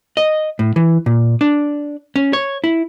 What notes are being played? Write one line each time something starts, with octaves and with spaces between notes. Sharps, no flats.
D#5
A2
E3
A#2
D4
C#4
C#5
E4